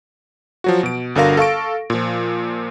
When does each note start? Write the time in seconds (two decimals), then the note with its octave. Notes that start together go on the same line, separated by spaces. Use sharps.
0.64 F3 F#3 F#4
0.83 B2 D7
1.15 G1 D3 F#4 A#4 F5 A#6
1.37 A4 F5 C#6 D7
1.90 A#2 F3